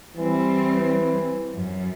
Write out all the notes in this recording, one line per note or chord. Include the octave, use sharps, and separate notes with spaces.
E3 G3 C4
F#2